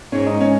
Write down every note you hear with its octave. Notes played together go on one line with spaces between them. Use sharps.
G#2 G#3 C#4
D#4
C#4